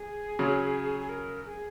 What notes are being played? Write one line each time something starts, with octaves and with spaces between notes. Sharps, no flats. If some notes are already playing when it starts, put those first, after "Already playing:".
Already playing: G#4
C#3 F#3
G#4
A#4
G#4